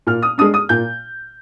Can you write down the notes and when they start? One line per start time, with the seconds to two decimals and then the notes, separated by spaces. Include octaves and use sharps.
0.07 A#2 F6
0.22 D#6
0.38 G#3 D4 D#6
0.54 D#6
0.69 A#2 G6